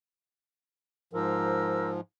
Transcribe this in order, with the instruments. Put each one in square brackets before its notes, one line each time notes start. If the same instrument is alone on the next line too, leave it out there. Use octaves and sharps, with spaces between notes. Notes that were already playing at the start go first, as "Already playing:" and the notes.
[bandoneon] G#2 F3 [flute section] A#4 C5 E6